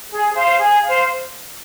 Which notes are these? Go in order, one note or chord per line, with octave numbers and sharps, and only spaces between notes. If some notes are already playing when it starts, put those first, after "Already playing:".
G#4
C5 F5
G#4
C5 F5